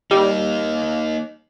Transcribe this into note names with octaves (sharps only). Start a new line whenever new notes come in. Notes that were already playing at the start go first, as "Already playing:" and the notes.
G3 A#3 D#4